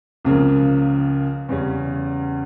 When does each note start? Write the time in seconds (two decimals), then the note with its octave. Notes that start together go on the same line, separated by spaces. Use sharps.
0.25 C#2 C#3 F3 A#3
1.49 E2 C#3 G3 C#4